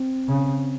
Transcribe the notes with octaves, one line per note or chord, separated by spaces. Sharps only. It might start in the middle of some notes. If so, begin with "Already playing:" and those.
Already playing: C4
C#3